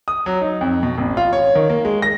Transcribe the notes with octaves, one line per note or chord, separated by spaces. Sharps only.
D#6
F#3
D#4
F2
B2
A1
F4
C#5
D#3
A#3
G#3
A#6